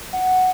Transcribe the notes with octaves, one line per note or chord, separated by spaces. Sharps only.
F#5